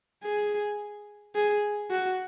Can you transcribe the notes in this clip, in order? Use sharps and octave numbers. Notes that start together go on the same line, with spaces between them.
G#4
G#4
F#4